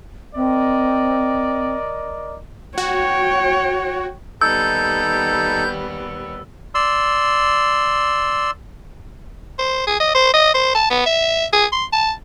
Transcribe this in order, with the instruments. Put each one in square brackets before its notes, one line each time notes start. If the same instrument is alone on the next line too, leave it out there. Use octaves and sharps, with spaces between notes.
[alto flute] C4 [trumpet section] A#4 D5 D#5
[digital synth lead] F#4 [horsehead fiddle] C#5 G5
[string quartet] D#2 G3 B3 [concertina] D#4 A4 [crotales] E6 [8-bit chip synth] G6
[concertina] D5 C6 E6
[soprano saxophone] C5
G#4
D#5
C5
D#5
C5
A5
B3
E5
G#4
C6
A5